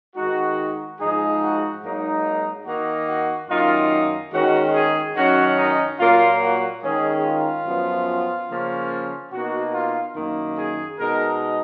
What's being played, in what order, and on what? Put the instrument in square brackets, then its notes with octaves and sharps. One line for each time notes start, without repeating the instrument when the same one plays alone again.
[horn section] D#3 G#3 D#4 F#4
G#2 F3 G#3 D#4 G#4
F#4
G#2 F#3 A#3 D#4
D#3 A#3 D#4 F#4
F#4
F#2 D#3 A#3 D#4 F4
D#3 G#3 C#4 F#4
G#4
F#2 D#3 F#3 C#4 F#4
D#4
A#2 F#3 A#3 F4
F#4
D#3 G#3 C#4 G#4
F4
F#2 F3 B3
C#3 F3 A#3 C#4
B2 A#3 D#4 F#4
F4
F#2 D#3 A#3
G#4
B2 G#3 D#4 A#4